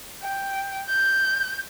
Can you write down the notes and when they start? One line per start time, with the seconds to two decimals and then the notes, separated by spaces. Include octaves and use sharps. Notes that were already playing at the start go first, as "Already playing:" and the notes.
0.23 G5
0.89 G6